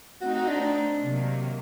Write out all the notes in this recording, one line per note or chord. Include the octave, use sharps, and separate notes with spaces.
A3 C4 D#4 F#4
F#4
D4
D4
C3 D#3 F#3 A#3